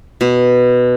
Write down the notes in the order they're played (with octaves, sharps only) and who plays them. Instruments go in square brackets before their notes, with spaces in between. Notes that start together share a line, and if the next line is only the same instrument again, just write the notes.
[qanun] B2